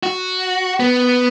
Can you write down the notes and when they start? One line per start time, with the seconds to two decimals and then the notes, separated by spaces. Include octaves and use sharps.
0.03 F#4
0.80 B3